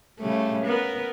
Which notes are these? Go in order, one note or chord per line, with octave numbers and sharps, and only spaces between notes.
C#3 G3 A3
B3 A#4